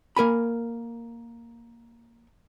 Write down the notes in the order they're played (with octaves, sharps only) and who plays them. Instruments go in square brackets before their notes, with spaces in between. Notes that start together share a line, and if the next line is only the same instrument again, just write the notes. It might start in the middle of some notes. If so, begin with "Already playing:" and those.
[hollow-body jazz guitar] A#3 A#4 G#5 B5